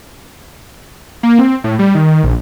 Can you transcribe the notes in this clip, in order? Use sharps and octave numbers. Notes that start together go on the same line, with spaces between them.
A#3
C4
A2
G3
D#3
A#1